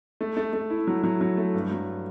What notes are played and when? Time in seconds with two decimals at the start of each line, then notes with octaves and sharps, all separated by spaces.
0.21 A3
0.37 A3
0.53 A3
0.70 E4
0.87 F#3
1.04 F#3
1.21 F#3
1.37 A3
1.54 G2
1.71 F#3